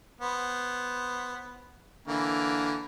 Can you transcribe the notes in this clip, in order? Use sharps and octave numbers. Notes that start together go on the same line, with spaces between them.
B3 C5
D3 E3 A#3